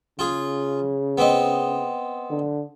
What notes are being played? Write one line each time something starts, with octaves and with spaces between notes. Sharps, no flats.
C#3 F4 G#4
B3 C4 D#5
D3